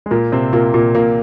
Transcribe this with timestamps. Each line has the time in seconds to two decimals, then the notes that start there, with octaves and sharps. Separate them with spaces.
0.06 G#3
0.11 A#2 A#3
0.32 C3 C4
0.53 A#2 A#3
0.74 A#2 A#3
0.95 A#2 A#3